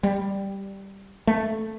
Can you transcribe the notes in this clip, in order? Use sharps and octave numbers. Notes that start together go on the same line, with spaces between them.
G3
A3